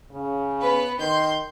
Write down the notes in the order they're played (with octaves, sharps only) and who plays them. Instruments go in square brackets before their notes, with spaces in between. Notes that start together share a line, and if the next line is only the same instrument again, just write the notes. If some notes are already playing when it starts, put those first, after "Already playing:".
[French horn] C#3
[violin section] B3 B4
[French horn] D#3 [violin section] C6 G6